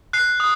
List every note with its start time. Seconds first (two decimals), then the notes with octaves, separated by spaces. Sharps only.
0.13 F#6 C7
0.40 D#6